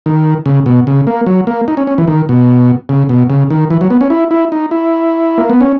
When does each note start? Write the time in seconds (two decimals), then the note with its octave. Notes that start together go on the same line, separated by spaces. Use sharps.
0.06 D#3
0.46 C#3
0.66 B2
0.87 C#3
1.07 A#3
1.26 F#3
1.47 A#3
1.68 D#4
1.77 C#4
1.87 C#4
1.98 E3
2.08 D#3
2.29 B2
2.89 C#3
3.09 B2
3.30 C#3
3.50 D#3
3.70 E3
3.81 F#3
3.90 B3
4.01 C#4
4.10 E4
4.31 E4
4.52 D#4
4.71 E4
5.38 A#3
5.50 B3
5.61 C#4